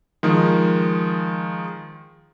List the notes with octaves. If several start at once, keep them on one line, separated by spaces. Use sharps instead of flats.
D#3 F3 G#3